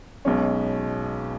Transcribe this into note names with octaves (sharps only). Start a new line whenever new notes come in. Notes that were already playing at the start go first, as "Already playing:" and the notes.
B1 B2 G#3 C#4